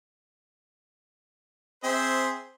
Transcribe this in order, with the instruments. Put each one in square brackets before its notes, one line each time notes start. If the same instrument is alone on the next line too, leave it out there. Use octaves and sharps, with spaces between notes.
[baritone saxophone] C4 [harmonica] G#4 C5 E5